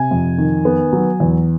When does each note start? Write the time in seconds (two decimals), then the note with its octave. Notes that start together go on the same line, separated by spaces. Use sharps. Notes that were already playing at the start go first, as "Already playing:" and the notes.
Already playing: C3 G#5
0.11 F2
0.38 D#3
0.65 B3
0.93 F#3
1.20 E2